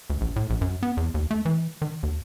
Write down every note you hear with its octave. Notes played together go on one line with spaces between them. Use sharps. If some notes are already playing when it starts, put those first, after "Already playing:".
D2
A#1
A2
A#1
F#2
B3
E2
D#2
A3
E3
D#3
D#2